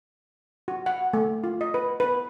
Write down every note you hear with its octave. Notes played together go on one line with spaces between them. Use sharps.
F#4
F#5
A3
F4
D#5
B4
B4